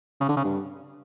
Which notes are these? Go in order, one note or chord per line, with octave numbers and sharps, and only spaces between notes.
C#3
D3
C#3
G2